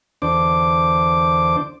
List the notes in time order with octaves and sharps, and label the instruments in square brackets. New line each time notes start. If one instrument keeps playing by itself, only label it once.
[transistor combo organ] E2 D3 D4 C5 D6